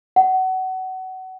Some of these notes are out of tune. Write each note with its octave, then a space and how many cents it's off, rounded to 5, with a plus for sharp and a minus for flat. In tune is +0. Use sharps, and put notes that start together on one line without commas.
F#5 +25